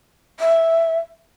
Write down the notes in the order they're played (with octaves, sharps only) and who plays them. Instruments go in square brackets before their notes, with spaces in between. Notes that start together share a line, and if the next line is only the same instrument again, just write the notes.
[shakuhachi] E5